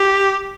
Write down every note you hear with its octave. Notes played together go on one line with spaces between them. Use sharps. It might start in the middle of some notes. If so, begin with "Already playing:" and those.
Already playing: G4